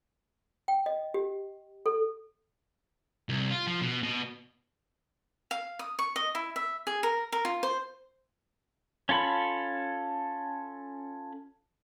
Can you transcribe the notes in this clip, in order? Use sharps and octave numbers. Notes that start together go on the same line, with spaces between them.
G5
D#5
G4
A4
C2
F4
F3
B2
B2
F5
D#6
C#6
D#5
E4
E5
G#4
A#4
A#4
F4
C5
C#4 F4 A4 B5